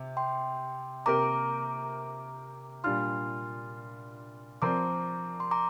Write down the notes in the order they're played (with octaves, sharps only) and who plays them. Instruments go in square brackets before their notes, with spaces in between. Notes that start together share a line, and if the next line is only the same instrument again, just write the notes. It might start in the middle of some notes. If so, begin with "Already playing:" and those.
Already playing: [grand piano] C3
[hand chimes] G5 C6
[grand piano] C3 A#3 G4 A#4 [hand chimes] A#5 D6
[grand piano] A#2 G3 D4 F4 [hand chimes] C6 F6
[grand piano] F3 C4 A#4 D5 [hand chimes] A#5 D6
[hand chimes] C6
A#5 D6